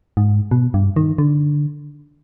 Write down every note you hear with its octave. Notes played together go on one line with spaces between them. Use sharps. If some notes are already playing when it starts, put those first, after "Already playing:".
G#2
B2
G2
D#3
D3